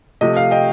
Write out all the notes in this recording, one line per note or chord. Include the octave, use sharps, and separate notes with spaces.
C3 F3 A3 D#5
F5
D#5 G5